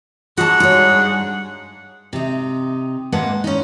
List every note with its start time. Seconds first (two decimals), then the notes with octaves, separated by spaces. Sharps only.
0.37 G#2 G#3 F#4 F#5 A5
0.60 G2 C#5
2.13 C3 D#4
3.12 G#2 G#3 A#3 D4 B4 F#5
3.44 C#4 D#4